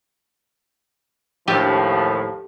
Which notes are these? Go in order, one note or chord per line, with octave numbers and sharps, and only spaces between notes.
D#2 A2 F3 G4 A4